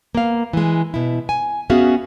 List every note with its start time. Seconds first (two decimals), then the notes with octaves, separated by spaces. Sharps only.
0.15 A#3 B3 F5
0.53 E3 G#3
0.94 B2 E4
1.29 G#5
1.70 B3 C#4 F#4 G#4 E5 F5